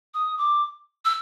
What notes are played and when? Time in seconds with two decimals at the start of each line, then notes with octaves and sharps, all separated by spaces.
0.14 D#6
0.38 D6
1.05 E6